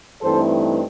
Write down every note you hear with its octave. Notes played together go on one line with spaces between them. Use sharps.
G2 E3 A3 C4 D#4 A4 C5